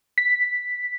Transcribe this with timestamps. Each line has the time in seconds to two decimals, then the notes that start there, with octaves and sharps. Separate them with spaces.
0.18 B6